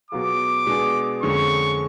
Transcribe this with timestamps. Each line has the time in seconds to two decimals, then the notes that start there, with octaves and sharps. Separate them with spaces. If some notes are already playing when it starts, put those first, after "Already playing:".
0.11 B2 F#3 B3 F4 G#4 D6
0.67 B2 G#3 B3 D4 G#4
1.23 F2 D3 G#3 C#4 C#6